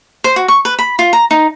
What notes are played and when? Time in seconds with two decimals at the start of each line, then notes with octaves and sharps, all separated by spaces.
0.24 C5
0.36 F#4
0.48 C#6
0.65 B4
0.79 B5
0.99 F4
1.13 A#5
1.31 D#4